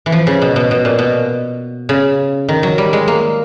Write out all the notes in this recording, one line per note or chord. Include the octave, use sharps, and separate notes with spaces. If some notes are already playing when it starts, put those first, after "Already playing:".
E3
F3
C#3
B2
B2
B2
A#2
B2
C#3
D#3
F#3
G3
G#3
A#3